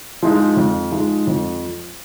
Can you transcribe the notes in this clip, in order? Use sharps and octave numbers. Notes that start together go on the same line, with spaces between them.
F3 G#3 D#4
F2
F3 G#3 D#4
F2